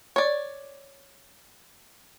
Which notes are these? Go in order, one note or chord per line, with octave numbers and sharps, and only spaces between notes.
C#5 D5